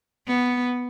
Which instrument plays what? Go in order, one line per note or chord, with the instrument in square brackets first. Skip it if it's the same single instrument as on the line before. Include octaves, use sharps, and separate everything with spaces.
[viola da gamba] B3